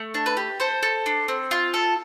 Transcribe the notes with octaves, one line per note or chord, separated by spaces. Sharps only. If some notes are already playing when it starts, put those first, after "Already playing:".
Already playing: A3
D4
B4
G4
A4 C5
A4
D4
C4
F4
A4